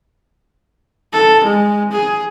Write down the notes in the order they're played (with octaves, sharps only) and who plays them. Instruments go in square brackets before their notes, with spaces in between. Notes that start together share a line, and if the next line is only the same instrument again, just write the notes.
[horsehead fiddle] A4
G#3
G#4